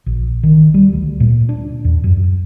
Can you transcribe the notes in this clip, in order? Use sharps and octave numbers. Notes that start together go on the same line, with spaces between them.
A#1
D#3
G3
D2
A#2
D4
E2
F#2